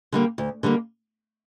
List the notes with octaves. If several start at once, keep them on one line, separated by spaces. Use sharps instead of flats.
D3 G3 A#3
D2
D3 G3 A#3